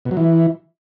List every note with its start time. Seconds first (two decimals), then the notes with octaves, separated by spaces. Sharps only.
0.05 B2
0.11 F#3
0.17 E3